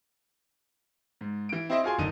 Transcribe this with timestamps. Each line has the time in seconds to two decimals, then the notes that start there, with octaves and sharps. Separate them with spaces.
1.21 G#2
1.49 E3 D7
1.69 C4 E4 C5 D#5 E5
1.84 F4 F#4 G#4 G#5 C6
1.98 F#1 D3 D#4 D#7